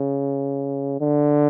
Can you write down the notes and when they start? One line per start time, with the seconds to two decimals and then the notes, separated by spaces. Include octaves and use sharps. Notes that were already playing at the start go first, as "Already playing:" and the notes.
Already playing: C#3
1.01 D3